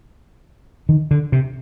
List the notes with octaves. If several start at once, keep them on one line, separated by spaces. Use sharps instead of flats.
D#3
D3
C3